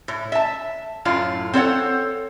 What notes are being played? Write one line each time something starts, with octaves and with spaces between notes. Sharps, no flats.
A2
E5 A5
F#2 A2 F4
C4 A4 C#5 F#5